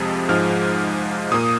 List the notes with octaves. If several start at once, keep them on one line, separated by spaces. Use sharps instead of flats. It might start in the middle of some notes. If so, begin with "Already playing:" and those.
Already playing: F2 C3 F3 G#3 D#6
G#2 F3 G#3 F6
A#2 A#3 D#6